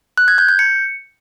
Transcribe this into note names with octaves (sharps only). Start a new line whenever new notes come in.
F#6
G#6
G6
G6
C#7